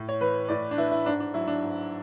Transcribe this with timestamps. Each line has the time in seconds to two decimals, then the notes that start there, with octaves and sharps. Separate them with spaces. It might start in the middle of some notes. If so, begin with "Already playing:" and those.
Already playing: A2
0.09 C#5
0.21 E3 B4
0.49 A2 D5
0.71 D4
0.78 E3 E4
0.91 E4
1.05 G#2 D4
1.20 D4
1.34 F#3 E4
1.47 D4
1.62 G#2